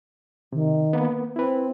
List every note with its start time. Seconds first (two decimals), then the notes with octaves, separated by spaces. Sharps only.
0.53 C3 D#3
0.93 A#3 B3
1.36 C4 E4 B4